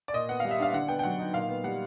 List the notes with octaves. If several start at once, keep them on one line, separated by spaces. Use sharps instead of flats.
D5
A#2 D#5
B3 F#5
G3 F5
E5
D4 F5
D3 F#5
B3 G5
G5
F#3 F#5
D#4
A#2 F5
B3
G3 F#5